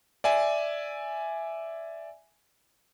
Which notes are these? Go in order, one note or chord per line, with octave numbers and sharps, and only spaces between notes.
D5 E5 G#5